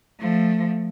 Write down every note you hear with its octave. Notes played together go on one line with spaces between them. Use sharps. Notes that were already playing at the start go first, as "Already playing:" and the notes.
F3 A3